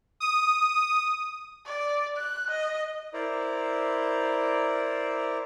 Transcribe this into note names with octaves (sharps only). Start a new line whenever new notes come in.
D#6
D5
F#6
D#5
E4 A#4 C5 D5